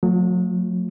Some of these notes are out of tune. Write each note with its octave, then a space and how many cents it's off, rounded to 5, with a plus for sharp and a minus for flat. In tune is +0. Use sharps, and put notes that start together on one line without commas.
F#3 -35 A3 +25 F4 +20